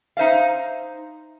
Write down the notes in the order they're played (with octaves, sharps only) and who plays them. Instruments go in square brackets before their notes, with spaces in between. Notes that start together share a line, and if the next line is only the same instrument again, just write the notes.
[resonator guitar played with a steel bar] D#4 C5 E5 F5